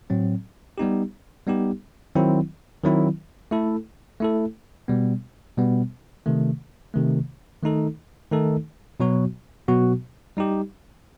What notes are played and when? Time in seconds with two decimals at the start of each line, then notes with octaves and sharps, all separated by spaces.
0.10 A2 F#3 C4
0.78 G3 B3 D#4 G4
1.47 G3 B3 D#4 G4
2.15 D#3 F#3 C4 E4
2.83 D#3 F#3 C4 E4
3.51 A3 E4 A4
4.20 A3 E4 A4
4.88 B2 G3 B3
5.57 B2 G3 B3
6.26 C3 D#3 A3
6.94 C3 D#3 A3
7.63 D#3 A3 D#4 A4
8.31 D#3 A3 D#4 A4
9.00 B2 F#3 B3 F#4
9.68 B2 F#3 B3 F#4
10.37 G3 D#4 G4